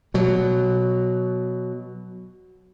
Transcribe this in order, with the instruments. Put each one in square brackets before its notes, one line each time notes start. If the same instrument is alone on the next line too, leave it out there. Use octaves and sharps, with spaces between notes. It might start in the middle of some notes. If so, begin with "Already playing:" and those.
[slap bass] B2 F#3